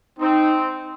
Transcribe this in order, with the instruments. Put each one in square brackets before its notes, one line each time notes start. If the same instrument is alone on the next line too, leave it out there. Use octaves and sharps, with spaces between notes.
[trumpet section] C4 [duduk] D#4